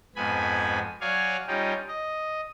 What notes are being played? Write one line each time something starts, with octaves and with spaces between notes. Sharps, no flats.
F2 G#2 B3 G#5 B5
F#3 C#5 D5 F5 G#5
G3 C#4 D#4 F4 G4
D#5